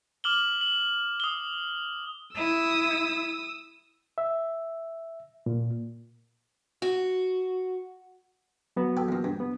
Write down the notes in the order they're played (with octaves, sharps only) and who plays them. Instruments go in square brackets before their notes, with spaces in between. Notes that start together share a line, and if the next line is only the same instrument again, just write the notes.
[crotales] D6 F6 F#7 G7
F#7
D#6 G7
[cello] E4 [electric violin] D#6 E6
[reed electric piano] E5
A#2
[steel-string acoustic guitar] F#4
[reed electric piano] F#3 B3 F#4
[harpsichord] G4 A4 B4
E2 A#2
G2
[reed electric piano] B3